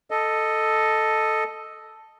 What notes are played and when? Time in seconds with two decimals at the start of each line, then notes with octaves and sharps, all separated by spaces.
0.11 A4 D#5